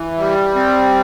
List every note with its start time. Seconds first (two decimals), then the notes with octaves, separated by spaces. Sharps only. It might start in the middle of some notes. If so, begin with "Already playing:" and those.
Already playing: E3
0.18 G3
0.55 C4